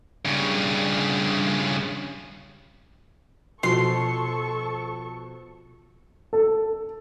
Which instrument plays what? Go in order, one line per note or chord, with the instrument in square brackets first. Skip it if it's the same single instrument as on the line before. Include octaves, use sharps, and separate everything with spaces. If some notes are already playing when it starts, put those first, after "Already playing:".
[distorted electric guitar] G2 C#3
[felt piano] B2 F3 F#4 [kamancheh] A4 C#6 [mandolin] C6
[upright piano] A4